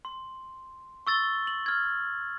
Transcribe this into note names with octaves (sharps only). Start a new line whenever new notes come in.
C6
C#6 E6 A6 G7
F#7
F6 G#6